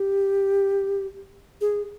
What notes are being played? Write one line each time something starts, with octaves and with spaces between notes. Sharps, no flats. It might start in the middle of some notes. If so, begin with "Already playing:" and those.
Already playing: G4
G#4